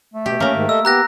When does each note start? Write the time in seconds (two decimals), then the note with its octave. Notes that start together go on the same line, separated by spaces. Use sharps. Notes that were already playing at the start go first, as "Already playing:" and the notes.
0.14 A3
0.26 B2 G4
0.40 A#3 C#4 A#4
0.54 G#2 D#3
0.69 A4 D#5 E5 E6
0.85 B3 G4 A#5 F#6 A#6